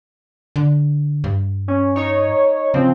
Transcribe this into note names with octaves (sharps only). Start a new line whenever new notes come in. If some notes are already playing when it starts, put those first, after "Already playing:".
D3
G2
C#4
D#4 C#5
C#3 F3 C4